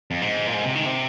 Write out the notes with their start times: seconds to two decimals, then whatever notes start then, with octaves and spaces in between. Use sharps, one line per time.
0.11 F2
0.22 G#2
0.47 A#2
0.54 G#2
0.64 C3
0.75 D#3
0.85 C3